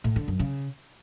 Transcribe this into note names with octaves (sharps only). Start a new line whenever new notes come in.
A2
D3
F#2
C#3